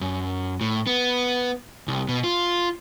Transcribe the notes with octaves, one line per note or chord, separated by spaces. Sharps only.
F#2
A2
B3
C2
B2
F4